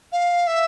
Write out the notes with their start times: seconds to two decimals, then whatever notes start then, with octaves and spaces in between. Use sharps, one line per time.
0.12 F5
0.47 E5